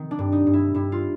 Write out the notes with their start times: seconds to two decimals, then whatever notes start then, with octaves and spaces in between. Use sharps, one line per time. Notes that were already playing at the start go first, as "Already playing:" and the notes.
Already playing: D#3 C4
0.11 D4
0.19 G2
0.32 D#4
0.47 G2
0.53 E4
0.74 G2 E4
0.92 F4